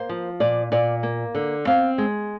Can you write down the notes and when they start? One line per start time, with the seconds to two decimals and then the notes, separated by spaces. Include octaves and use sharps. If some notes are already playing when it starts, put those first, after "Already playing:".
Already playing: A#3 C5
0.09 F3
0.40 A#2 D5
0.72 A#2 D5
1.03 A#3
1.35 D3
1.67 C4 F5
1.98 G#3